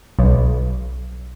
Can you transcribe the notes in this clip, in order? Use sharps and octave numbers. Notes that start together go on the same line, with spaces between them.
B1